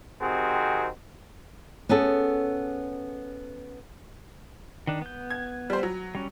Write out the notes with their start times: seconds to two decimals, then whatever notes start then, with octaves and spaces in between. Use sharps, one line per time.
0.21 C3 D#3 C4 F#4 G#4
1.89 B3 C#4 G#4 A4
4.87 D#3 D4
5.02 B3 G6
5.31 G#6
5.70 G3 C5
5.83 F#3
6.15 G3 C#4